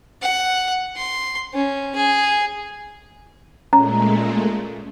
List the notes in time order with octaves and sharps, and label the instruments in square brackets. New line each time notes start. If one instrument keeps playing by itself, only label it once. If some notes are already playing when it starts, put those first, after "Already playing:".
[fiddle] F#5
C6
C#4
G#4
[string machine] A#2 G#3 A3 [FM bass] C#4 [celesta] A#5